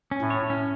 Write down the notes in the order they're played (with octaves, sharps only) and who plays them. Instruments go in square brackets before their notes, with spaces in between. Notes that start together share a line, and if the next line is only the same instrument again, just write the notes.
[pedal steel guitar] C#4
[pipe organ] A2
[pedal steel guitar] C#5
C#4